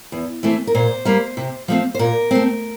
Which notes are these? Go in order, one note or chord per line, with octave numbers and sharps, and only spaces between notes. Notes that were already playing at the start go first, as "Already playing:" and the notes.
E2
E3 A3 C4
A#4
A#2 C5
G3 A#3
C3
F3 A3 C4
C5
A#2 A#4
A3 C4